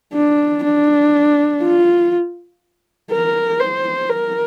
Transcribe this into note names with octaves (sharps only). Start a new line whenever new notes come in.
D4
D4
F4
A#4
C5
A#4